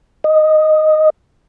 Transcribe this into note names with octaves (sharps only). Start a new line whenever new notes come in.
D#5